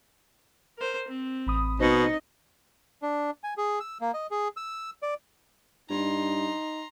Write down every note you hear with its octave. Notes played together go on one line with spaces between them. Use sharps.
A#4 C5
C4
A1 B5 D#6
B2 D#4 C5 D#5 C#7
D4
G#5
G#4
E6
A#3
D#5
G#4
E6
D5
G2 D#4 A#5 C6